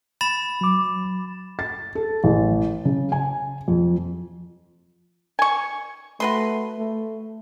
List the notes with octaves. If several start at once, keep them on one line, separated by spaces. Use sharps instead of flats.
B5 A6 E7
F#3 D6
A6
A4
A1
C#3
G#5
F2
G#5 C#6
A3 F#4 B4 C6
A3